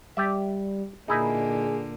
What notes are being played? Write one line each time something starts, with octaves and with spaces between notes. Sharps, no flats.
G3 G4 D5 E5
A#2 D3 A#3 D#4 E4 G#4 D#5